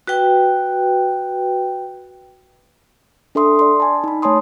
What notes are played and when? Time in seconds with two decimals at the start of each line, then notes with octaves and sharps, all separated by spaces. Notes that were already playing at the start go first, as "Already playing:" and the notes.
0.07 F#4 B4 G5
3.35 D4 A4 E5 C6 D#6
3.59 D5 C6
3.80 G#5 A5
4.04 D#4 B5
4.22 A3 C#5 G#5 A5 C6 D#6